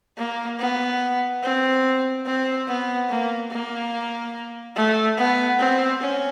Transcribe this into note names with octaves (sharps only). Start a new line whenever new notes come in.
A#3
B3
C4
C4
B3
A#3
A#3
A3
B3
C4
C#4